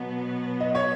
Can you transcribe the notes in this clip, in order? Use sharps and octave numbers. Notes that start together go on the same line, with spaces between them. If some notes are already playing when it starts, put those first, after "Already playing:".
Already playing: B2 F#3 B3
D#5
C#5